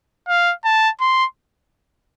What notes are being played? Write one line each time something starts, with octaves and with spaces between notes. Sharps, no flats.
F5
A5
C6